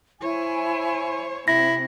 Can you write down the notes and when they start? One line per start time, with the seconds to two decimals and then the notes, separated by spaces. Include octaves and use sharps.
0.21 E4 C5 C#5 G#5
1.48 C3 C4 E4 A#6